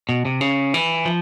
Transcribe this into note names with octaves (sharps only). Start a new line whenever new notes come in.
B2
C3
C#3
E3
F3